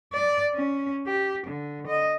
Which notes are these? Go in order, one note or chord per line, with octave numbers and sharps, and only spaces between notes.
D5
C#4
G4
D3
D#5